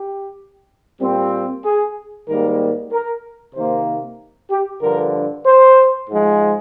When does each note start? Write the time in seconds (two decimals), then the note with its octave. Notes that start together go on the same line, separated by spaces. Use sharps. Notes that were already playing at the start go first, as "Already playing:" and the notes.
Already playing: G4
1.01 A#2 G3 C4
1.65 G#4
2.28 G#2 D#3 G3 A#3 A#4
2.92 A#4
3.55 C3 D#3 A#3 C5
4.51 G4
4.82 G2 D3 F3 A#4
5.46 C5
6.10 G#2 F3 G#3